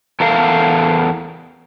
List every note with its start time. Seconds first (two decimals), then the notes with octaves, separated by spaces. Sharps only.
0.20 E2 A4 A#4 F5